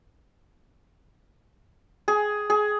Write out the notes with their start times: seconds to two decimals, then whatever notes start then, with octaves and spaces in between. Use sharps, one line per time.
2.08 G#4
2.50 G#4